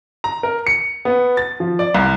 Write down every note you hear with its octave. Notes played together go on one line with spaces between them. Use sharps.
A#5
A#4
C#7
B3
A6
F3
D5
C2